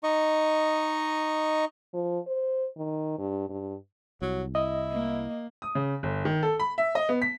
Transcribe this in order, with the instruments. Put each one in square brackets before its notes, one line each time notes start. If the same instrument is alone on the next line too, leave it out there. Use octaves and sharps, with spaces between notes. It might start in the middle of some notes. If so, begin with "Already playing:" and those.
[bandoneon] D#4 D#5 C#6
[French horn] F3
C5
D#3
G2
G2
[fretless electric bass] C2 [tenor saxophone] F#3
[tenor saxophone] E4 [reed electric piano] D#5
[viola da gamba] A#3
[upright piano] D#6
C#3
G1
D#3
A4
B5
E5
D#5
B3
B6